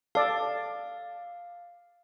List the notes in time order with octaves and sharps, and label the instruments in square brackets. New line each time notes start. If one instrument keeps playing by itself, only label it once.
[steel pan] A4 D5 [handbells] F5